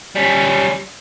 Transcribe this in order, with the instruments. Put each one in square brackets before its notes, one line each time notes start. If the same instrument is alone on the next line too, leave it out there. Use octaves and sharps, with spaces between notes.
[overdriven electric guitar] G3 C#4